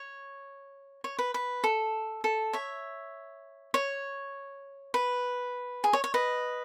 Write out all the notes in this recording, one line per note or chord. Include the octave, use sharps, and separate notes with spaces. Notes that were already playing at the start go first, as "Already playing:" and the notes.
Already playing: C#5
C#5
B4
B4
A4
A4
C#5 E5
C#5
B4
G#4
C#5
C#5
B4 D#5